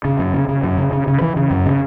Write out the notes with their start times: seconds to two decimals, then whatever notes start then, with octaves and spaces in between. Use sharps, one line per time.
0.05 C#3
0.19 F#2
0.34 C#3
0.48 C#3
0.63 F#2
0.78 C#3
0.92 C#3
1.07 C#3
1.21 E3
1.36 C#3
1.51 F#2
1.66 C#3